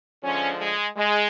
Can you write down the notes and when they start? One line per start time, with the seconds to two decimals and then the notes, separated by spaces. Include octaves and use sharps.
0.23 D3 F3 G#3 C#4
0.60 G#3
0.97 G#3